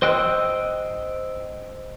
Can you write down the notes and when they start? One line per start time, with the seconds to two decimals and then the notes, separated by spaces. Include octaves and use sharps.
0.02 C5 D#5 G5 E6 F#6